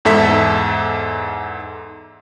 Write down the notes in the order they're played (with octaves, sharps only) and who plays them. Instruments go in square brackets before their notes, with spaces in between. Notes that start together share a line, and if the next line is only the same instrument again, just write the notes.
[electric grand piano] E2 G#2 A4 E5 B6